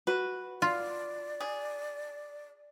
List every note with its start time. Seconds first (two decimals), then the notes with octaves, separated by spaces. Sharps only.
0.07 F#4 B4
0.62 F4 D5
1.40 G#4